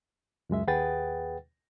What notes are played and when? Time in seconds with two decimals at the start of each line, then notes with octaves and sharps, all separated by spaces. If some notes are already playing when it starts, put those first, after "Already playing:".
0.50 C#2 F#2 G#3 E5
0.67 D#2 G#4 B4 F#5 G5 A6